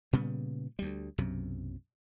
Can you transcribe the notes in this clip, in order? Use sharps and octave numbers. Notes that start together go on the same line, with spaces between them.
A#2 C#3 G3 B3
D2 G3
B1 F#2 C3